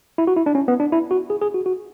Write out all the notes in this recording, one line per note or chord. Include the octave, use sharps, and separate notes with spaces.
E4
F#4
E4
D4
C#4
B3
D4
E4
F#4
G#4
G#4
F#4
F#4